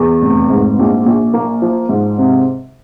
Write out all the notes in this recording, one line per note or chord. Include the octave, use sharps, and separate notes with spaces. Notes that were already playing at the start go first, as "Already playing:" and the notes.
Already playing: E2
F1
G#2
A#1
A#1
A#3
F3
G#2
C3